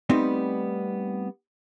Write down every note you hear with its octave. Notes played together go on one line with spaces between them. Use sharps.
G3 A3 B3 C4 D#4